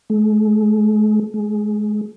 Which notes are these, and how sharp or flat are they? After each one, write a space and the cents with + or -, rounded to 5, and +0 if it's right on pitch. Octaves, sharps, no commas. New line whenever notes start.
G#3 +45
G#3 +25